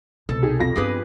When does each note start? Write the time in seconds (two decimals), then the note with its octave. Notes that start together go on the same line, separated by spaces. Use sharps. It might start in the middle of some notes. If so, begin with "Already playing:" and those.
0.29 C2 B2 A4
0.42 D#4 G4 G#4
0.59 F2 F4 A#6
0.76 G2 B3 G4 G#4 B4